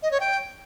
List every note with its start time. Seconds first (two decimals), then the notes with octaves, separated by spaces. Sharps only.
0.02 D#5
0.11 C#5
0.20 G5